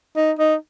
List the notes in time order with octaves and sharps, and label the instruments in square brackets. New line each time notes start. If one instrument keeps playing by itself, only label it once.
[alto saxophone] D#4
D#4